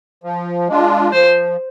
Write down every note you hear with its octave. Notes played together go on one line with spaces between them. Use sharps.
F3
G#3 D4 F4
F3 C5